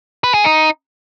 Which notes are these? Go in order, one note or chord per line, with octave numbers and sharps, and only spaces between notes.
B4
G#4
D#4